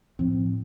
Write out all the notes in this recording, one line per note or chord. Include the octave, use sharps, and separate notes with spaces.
A2 F3 C4